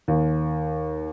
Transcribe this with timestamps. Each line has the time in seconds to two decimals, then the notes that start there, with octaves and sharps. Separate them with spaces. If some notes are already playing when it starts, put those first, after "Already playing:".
0.08 D#2